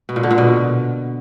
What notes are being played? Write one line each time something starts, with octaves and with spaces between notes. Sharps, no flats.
B2
A#2
D3
A#2
B2